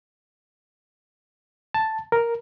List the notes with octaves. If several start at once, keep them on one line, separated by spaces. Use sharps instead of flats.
A5
A#4